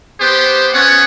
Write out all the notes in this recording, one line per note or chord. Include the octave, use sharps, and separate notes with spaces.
B3 G4 C5
B3 C#4 C#5 F#5